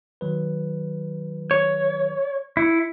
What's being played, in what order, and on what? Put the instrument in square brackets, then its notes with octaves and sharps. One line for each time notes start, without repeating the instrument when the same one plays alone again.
[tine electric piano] D#3 F#3 B4
[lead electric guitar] C#5
[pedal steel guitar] E4 [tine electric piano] C#7